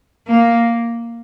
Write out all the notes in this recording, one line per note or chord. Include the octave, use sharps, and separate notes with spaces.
A#3